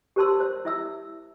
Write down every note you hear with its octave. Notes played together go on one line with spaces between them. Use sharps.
G4 A#4 C5 A5 C6 E6
C5
E4 E5 E6